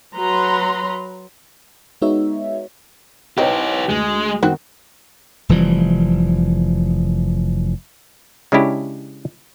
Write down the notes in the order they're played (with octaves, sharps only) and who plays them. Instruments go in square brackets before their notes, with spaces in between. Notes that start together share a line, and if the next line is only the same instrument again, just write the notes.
[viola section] F#3 B4 A#5 C6
[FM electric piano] G#3 B3 D#4 F#4 C#5 E5
[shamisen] C4 D#4 [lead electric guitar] E4 G4 [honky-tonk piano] B4 C#5 D#5
[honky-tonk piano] D2 [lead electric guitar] G#3
[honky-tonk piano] D#3 [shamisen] B3 C4 F#4
[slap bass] F1 E3 F3 G3
[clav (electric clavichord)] C#3 G#3 C#4 D4 E4 G4